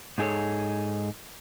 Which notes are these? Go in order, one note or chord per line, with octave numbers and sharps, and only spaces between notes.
G#2 D#4 G#4 A4 C#5